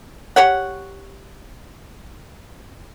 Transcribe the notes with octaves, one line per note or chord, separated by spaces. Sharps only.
G4 C#5 F#5